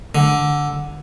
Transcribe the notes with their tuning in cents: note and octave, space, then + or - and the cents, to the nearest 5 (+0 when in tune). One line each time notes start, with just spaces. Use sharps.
D3 -5